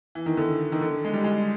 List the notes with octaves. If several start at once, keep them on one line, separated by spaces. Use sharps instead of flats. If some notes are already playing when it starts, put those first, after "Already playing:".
E3
D#3
D3
D#3
D3
G#3
G3
G#3